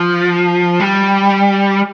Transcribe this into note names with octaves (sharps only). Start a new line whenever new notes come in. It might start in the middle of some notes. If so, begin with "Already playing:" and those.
Already playing: F3
G3